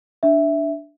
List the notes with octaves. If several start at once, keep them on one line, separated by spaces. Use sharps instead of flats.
D4 E5